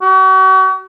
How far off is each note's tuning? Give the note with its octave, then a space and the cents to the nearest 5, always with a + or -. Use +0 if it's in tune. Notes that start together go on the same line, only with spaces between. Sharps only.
F#4 +40